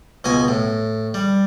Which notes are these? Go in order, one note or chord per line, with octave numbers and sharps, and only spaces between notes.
C#2 B2 D#5 G#5
A2
G3